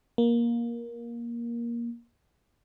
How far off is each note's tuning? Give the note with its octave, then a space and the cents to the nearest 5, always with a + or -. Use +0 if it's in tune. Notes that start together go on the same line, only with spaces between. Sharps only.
A#3 +15